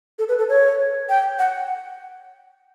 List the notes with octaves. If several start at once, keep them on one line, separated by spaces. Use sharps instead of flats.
A4
B4
A4
C#5
G5
F#5